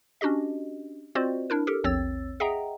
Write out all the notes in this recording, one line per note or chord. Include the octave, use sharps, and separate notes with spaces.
C#4 D4 F#4 G4 D#5
C4 F4 F#4 C5 D5 D#5
D4 E4 A#4
G4 A4 A#4
A#1 E2 C4 C#5 E6 A6
G#4 D#5 E5 F#5 G5 A#5